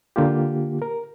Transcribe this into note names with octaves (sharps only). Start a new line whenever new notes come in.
D3 A#3 F4 G4
A#4